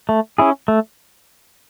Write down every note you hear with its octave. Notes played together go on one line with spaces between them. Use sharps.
A3
C#4 E4 G#4
A3